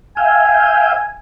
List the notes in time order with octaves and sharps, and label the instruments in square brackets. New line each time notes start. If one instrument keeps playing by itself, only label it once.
[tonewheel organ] E5 F5 G5 [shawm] G#5